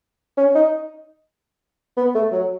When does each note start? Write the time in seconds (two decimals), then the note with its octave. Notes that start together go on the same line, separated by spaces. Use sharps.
0.37 C#4
0.55 D#4
1.97 B3
2.15 A3
2.32 F#3